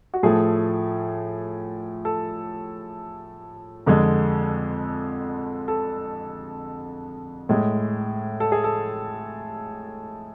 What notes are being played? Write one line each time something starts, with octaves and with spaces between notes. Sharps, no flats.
F#4
A2 F3 A3 G#4
A4
F2 D3 G#3
A4
A2 G#3
A4
G#4
A4